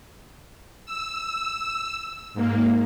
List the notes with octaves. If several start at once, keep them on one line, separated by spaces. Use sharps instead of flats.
E6
G#2 A#3